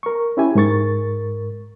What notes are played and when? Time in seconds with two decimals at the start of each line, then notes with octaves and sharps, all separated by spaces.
0.03 A#4 C#6
0.37 C#4 E4 G4 G#5
0.55 G#2 A#4 C#6 A6